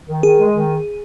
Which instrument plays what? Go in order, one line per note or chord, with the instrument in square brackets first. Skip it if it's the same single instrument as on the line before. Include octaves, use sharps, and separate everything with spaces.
[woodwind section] D#3
[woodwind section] D#3 [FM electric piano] G#4
[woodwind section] G#3
D#3